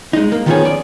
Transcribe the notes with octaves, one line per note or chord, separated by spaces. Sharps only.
G#3 D#4
A#3
D#3 F3 A#3 B3 C#4 G#4
D5